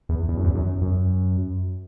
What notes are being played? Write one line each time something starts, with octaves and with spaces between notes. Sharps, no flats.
E2
E2
F#2
E2
F#2
F#2